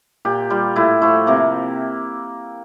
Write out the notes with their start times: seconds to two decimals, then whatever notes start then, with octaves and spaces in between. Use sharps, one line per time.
0.25 A#2 G4
0.50 G3 F4
0.76 A2 E4
1.02 F3 A3 E4
1.27 C3 A#3